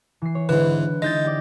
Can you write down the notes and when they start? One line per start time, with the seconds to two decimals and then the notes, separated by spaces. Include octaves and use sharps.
0.22 E3 C7
0.35 C#5
0.49 G#2 D3 E3 B4
1.02 G#3 D#4 E4 D#5 G6 A6
1.24 G4 D5